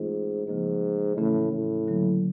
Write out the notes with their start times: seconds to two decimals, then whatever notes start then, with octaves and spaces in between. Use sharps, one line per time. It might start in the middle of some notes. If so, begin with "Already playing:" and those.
Already playing: G#2 E3 A3 C4 F4 G#4
0.47 G#2 C#3 F3 A#3
1.17 A2 C#3 E3 A3 C#4
1.53 A2
1.87 D3 F#3 A#3